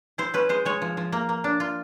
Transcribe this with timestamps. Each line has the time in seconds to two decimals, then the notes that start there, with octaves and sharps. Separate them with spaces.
0.18 E4 C5
0.34 C#4 B4
0.49 G#3 C5
0.65 G#3 C#5
0.82 F3
0.97 F3
1.12 A#3
1.29 A#3
1.44 D4
1.60 F4